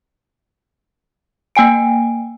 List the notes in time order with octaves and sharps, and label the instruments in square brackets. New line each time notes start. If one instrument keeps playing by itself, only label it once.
[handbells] A#3 G5 G#5 D7